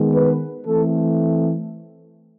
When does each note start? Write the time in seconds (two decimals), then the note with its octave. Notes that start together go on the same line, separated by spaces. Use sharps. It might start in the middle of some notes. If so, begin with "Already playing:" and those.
Already playing: D#3 G#3 B3
0.14 B4
0.67 E3 A3 C4 A4